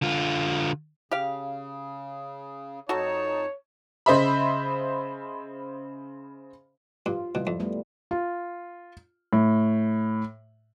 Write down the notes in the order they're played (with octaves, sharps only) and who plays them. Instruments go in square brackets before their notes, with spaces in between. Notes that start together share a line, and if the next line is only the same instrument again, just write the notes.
[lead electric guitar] D3 F4
[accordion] C#3 [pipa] G4 F5
[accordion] F2 D#4 A5 [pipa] F#4 A4 [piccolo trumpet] C#5
[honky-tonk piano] C#3 C5 D#5 E5 B5
[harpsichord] G2 [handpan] F4
[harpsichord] B2 [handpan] G3 E4
[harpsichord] F2
[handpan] G3 A3 B3
[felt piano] F4
A2